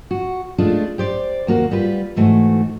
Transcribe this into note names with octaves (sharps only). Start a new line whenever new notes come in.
F#4
G#3 A3 D4 F4
G4 C5 D5
D#2 A#3 F#4
G3 F4 B4
G#2 E3 A3 F#4